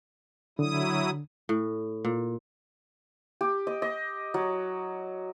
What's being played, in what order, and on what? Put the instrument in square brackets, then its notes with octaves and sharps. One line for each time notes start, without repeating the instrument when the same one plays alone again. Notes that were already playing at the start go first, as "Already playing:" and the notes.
[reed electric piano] D3 [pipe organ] F#3 E4 D#6
[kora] A2
A#2
[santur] G4
D#5
D#5
F#3